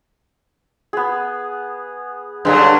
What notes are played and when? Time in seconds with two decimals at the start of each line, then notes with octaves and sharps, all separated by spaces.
0.93 B3 G#4
2.45 G2 D3 F#3 G#3